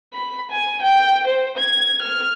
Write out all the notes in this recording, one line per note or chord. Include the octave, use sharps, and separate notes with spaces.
B5
G#5
G5
C5
G#6
F6